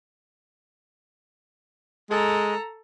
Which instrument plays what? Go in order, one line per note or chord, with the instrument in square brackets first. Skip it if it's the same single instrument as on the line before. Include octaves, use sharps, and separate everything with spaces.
[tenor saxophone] G#3 [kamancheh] A4 A#5